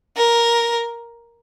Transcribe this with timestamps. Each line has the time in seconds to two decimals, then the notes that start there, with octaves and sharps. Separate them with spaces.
0.16 A#4